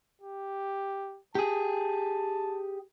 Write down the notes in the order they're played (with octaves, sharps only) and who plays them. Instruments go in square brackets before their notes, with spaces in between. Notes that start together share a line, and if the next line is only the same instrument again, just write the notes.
[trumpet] G4
[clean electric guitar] G4 G#4 [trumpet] A5